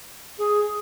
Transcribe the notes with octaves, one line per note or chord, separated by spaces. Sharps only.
G#4